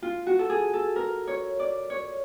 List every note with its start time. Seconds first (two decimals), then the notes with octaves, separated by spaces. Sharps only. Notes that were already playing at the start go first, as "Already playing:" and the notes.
0.02 F4
0.27 F#4
0.39 A4
0.49 G#4
0.74 A4
0.96 A#4
1.27 C#5
1.59 D5
1.90 C#5